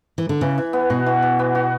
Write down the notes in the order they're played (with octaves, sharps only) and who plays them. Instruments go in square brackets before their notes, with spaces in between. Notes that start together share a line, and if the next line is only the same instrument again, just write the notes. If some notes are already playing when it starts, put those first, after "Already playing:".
[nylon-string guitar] E3
D3
[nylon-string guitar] C#3 [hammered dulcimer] E3
[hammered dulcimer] E3
B3
[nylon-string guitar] B2 [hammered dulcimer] F#4
[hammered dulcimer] E3
E3
B3
F#4